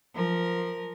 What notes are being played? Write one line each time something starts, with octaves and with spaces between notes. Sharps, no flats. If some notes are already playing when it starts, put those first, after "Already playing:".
F3 A#4